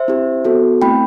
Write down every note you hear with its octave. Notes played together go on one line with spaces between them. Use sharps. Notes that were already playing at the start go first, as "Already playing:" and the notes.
Already playing: C5 E5
C4 E4 G4
B3 F#4 A4
A3 C4 E4 G5 B5